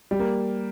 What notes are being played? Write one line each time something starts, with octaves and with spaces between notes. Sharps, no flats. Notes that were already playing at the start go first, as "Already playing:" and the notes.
G3
A#3